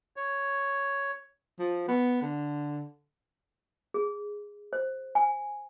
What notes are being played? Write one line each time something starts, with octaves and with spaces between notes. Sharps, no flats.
C#5
F3
B3
D3
G#4
C5
G#5